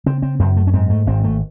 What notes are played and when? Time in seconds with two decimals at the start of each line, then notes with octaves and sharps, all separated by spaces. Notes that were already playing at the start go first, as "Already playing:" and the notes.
0.06 C#3 C4
0.22 C4
0.39 F#2 C4
0.57 A3
0.67 C#4
0.74 G#2 C4
0.90 A3
1.06 G#1 C4
1.24 A3